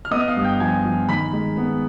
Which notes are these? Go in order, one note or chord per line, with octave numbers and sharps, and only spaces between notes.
F6
B3 D#5 D#6
F5 F6
G2
G5 G6
F3 G#5 G#6
F3
D#3 B5 B6
G#3
B3